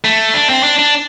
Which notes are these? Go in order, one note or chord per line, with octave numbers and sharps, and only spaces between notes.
A3
D4
C4
D4
D4